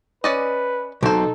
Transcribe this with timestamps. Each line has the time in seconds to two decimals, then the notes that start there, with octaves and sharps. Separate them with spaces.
0.24 C#4 B4 D5 D#5
1.03 B1 C4 D#4 A4 C5